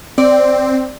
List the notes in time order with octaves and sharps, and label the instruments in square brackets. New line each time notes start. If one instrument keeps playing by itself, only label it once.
[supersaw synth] C4 [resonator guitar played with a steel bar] D5